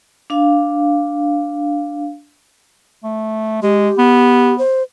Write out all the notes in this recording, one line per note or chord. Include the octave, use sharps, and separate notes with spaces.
D4 F5
A3
G#3 G4
B3
C5